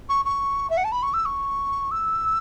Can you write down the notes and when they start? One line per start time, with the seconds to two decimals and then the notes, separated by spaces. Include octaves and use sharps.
0.09 C#6
0.25 C#6
0.70 E5
0.77 F#5
0.84 A5
0.92 B5
1.03 C#6
1.14 E6
1.25 C#6
1.91 E6